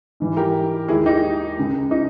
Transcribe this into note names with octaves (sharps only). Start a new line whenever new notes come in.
G#2 E3 G3
G4 A#4
D#2 D#3 G#3 E4 G#4
D#4 G4
C#2 C#3 G#3
D#4